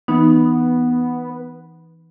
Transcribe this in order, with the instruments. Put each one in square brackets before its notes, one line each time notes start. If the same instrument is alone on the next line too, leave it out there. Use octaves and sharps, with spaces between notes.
[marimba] E3 D#4 [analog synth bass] B3